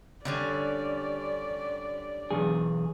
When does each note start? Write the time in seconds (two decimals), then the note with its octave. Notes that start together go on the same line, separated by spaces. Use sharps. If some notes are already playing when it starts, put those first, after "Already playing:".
0.25 D3 G3 C#4 D5
2.31 B1 E2 G#4